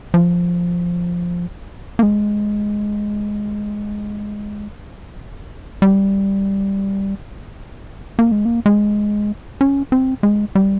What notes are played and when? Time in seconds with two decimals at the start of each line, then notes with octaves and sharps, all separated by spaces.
0.14 F3
1.99 A#3
2.03 G#3
5.82 G3
8.19 A#3
8.32 G#3
8.45 A#3
8.66 G#3
9.61 C#4
9.92 C4
10.23 G#3
10.55 G3